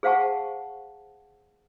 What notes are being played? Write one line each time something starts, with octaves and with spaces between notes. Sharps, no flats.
G#4 C5 F5 F#5 A5 C#6